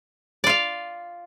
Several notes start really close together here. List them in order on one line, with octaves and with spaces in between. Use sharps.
D5 F4 F5